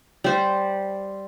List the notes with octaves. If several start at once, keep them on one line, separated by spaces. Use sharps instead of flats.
G3 C5